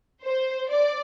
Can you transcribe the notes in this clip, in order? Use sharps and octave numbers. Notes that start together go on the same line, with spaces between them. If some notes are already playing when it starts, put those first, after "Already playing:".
C5
D5